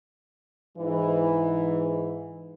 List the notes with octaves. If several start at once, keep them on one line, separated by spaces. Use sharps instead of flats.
G#2 E3